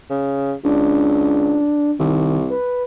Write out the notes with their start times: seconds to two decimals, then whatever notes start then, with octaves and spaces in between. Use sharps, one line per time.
0.10 C#3
0.64 C#2 D4
1.99 C2 D#3
2.50 B4